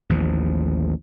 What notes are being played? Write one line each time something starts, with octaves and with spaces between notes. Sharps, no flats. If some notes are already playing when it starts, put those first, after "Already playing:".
A1 D#2 F3